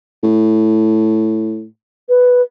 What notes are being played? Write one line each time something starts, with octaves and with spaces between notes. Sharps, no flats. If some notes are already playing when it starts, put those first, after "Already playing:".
A2
B4